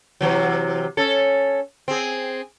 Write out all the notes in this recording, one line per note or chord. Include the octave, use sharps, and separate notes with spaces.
C3 E3 F#3
C#4 A4
C4 G#4